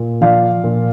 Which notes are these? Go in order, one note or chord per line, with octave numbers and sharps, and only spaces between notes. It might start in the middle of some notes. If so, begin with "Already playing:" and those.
Already playing: A#2
F3 D5 F5
A#2